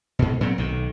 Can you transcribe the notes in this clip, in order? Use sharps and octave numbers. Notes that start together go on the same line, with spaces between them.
G#2 B2
A#2 F#3 C4
B1 D#3